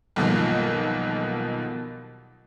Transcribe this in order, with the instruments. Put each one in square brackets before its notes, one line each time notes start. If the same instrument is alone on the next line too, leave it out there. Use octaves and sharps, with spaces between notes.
[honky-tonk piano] B1 G2 B2 D#3 F3 A#3